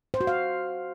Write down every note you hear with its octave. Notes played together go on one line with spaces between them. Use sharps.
C5
F#4
F5